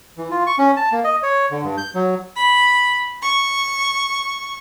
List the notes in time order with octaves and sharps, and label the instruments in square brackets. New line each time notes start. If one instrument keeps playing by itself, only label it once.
[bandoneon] E3
F4
C#6
C#4
A5
A#3
D#5
C#5
D3
G2
G6
F#3
[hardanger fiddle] B5
C#6